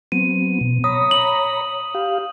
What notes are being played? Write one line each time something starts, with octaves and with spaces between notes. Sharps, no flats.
F#3 B3 C4 D#7
B2
C#5 A#5 B5 D#6
F#7
G4 F5